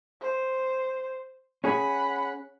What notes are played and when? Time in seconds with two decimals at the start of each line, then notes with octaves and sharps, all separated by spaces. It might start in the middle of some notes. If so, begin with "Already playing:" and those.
0.21 C5
1.64 C#4 G#4 F#5 B5